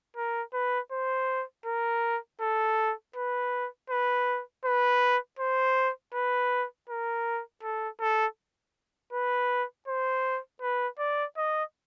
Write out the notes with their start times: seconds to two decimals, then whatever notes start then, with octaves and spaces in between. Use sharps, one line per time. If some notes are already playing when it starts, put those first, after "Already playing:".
0.17 A#4
0.54 B4
0.92 C5
1.66 A#4
2.41 A4
3.16 B4
3.90 B4
4.65 B4
5.39 C5
6.14 B4
6.89 A#4
7.63 A4
8.00 A4
9.13 B4
9.88 C5
10.62 B4
10.99 D5
11.37 D#5